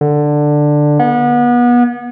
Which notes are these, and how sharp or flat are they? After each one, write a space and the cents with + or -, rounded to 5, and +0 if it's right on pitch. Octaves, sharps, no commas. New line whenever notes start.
D3 +10
B3 -30